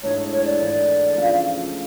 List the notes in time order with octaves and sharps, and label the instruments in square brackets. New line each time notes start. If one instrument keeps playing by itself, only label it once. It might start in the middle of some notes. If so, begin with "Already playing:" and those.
[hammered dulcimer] G#2 E3 A3 D4 [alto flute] C#5
[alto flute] C#5
D5
[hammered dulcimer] G#2 E3 A3 D4
C#3 F3 A3